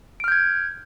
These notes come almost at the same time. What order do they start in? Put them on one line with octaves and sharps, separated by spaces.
D7 F6 G6 G#6